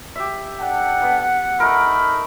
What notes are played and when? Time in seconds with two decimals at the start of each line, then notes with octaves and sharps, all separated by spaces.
0.16 G4 E5
0.60 D4 A4 F#5 G5
1.02 B3
1.60 A3 D#4 A#4 B5